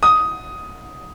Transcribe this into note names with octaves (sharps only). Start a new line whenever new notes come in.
D#6